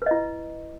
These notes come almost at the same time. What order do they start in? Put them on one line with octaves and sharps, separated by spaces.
B4 D#5 E4